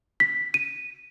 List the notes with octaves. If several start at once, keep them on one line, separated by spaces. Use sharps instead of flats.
B6
D#7